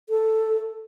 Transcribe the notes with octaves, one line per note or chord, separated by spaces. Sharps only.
A4